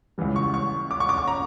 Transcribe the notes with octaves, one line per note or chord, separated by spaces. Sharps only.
C#2 C#3 E3 G3
C#6
C#6
D6
C#6
D6
C#6
A#5